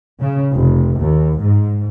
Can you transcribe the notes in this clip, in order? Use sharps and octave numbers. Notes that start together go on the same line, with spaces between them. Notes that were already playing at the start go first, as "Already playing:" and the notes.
C#3
F1
D#2
G#2